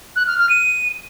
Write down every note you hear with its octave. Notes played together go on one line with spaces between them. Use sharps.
F#6
F6
F6
D#7